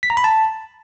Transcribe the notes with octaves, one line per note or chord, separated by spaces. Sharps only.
B6
A#5
B5
A5